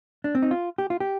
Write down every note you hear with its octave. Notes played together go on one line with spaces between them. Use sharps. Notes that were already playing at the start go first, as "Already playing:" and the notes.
D4
C4
D#4
F4
G4
F4
G4